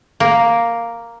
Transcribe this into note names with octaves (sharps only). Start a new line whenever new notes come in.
A#3